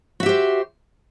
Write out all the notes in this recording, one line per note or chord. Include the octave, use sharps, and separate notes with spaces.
F#4 G4 C5 E5